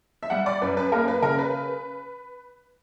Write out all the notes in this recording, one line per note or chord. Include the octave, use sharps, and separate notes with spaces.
E5
G3 F#5
D5
F#2 B4
B4
A#3 A#4
B4
C#3 A#4
B4